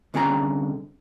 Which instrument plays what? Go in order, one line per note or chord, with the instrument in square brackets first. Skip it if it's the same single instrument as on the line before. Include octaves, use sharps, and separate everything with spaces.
[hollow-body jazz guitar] C2 D3 C#4 G#4 A#5